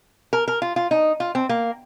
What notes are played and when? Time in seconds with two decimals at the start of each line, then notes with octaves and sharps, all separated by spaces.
0.33 A#4
0.48 A#4
0.62 F4
0.76 F4
0.91 D#4
1.20 F4
1.35 C4
1.49 A#3